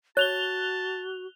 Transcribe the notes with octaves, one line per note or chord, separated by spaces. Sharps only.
F#4 C#5 A5 F#6 F7 G7